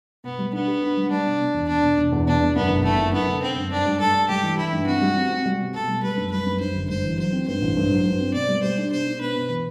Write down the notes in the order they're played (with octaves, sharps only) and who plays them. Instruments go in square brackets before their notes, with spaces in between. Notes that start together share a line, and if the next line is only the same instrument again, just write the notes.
[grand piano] B2 [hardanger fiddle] B3
[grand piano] G3
[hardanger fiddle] B3 [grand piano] D4
[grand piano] G4
D4
G3
[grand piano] G3 [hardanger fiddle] D4
[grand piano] B2
B2
E2
[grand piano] B2 [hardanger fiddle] D4
[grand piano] B2
E1
E2
[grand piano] B2 [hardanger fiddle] D4
[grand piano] B2
[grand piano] F#2 [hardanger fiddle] B3
[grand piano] F#1
[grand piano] F#1 [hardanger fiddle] A3
[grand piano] F#2
[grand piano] F#2 [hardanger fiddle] B3
[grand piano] D3
[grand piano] D3 [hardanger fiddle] C4
[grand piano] F#2
[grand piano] G2 [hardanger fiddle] D4
[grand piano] G3
[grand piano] G2 [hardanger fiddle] A4
[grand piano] G2
[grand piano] G3 [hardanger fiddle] G4
[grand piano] E3
[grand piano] E3 [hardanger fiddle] E4
[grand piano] G2
[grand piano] C4 [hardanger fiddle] F#4
[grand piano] G3
C4
C4
G3
B2
[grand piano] B2 [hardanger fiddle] A4
[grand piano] G3
[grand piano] G3 [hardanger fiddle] B4
[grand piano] F#2
[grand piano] G3 [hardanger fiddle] B4
[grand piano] F#2
[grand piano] F#2 [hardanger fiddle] C5
[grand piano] G1
[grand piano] G3 [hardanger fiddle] C5
[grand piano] E3
[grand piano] F#3 [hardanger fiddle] C5
[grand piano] C4
[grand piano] G2 [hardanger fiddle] C5
[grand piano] A1
G2
F#3
G2
C4
[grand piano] B2 [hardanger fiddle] D5
[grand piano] G3
[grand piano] G3 [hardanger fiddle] C5
[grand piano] D4
[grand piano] B2 [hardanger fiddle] C5
[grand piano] D4
[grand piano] B3 [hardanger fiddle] B4
[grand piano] B2
E3